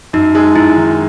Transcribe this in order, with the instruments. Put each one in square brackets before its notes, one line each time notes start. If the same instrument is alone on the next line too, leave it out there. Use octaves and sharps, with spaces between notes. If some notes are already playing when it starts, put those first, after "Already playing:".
[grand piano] F#2 [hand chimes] D#4
[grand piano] G#3 [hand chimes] D#4
[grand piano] F#2 [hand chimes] E4
[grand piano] D#3